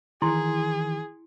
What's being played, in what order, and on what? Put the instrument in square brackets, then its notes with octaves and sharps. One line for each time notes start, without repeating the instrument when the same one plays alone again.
[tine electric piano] D#3 E3 [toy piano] E4 C6 [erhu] G#4